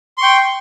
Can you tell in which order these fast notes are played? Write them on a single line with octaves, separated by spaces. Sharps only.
C6 C#6 G5